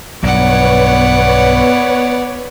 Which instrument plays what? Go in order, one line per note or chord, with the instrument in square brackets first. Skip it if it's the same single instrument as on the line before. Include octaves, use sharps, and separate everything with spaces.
[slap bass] B1 G2 [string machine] B3 B4 C#5 [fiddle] D5 F#5